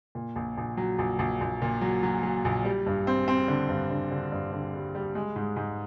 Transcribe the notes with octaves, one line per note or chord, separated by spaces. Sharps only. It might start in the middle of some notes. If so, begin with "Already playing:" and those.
A#2
A#1
A#1
F#3
A#1
A#1
A#1
A#2
F#3
F#3
F#3
A#1
G3
G2
C4
C4
D3
G2
D3
D3
G2
D3
G3
G3
G#3
G#2
G#2